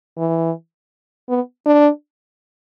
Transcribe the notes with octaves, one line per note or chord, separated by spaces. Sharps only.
E3
B3
D4